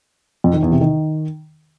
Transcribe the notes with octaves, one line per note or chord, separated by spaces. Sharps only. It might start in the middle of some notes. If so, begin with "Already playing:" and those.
F2
D#3
E2
C3
D#3